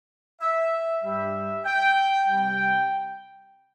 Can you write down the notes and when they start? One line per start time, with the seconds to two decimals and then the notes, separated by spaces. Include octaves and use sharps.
0.41 E5
1.03 G2 G3 E5
1.66 G5
2.28 C3 G3 G5